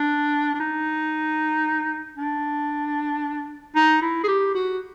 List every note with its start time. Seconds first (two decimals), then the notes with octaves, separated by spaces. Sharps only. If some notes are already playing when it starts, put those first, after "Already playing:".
Already playing: D4
0.54 D4
0.60 D#4
2.17 D4
3.76 D#4
4.02 E4
4.23 G#4
4.28 G4
4.55 F#4